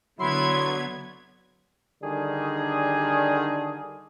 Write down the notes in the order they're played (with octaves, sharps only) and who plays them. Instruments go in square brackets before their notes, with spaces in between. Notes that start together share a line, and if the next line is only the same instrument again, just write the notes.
[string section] D3 B3 G#6 [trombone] F#3 [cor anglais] E4 [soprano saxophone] C6
[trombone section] D3 D#3 G3 D4 G#4